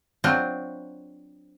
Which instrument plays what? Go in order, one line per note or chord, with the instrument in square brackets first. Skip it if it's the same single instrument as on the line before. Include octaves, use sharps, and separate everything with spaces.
[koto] F#3 C4 D4 F4